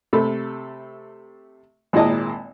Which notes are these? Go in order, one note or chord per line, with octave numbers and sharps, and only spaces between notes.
C3 A3 A4 B5
G#1 A#2 G#3 E4 D#5 A5